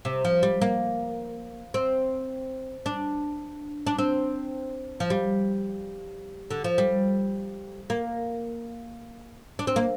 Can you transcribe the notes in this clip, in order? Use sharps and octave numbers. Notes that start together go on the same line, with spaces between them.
C3
F3
G3
A#3
C4
D4
D4
C4
F3
G3
D3
F3
G3
A#3
D4
C4
A#3